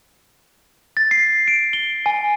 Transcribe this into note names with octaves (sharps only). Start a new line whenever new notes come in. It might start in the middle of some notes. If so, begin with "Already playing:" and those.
A6
C7
D7
G7
G#5